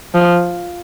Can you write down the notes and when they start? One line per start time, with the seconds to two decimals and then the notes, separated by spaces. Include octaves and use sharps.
0.14 F3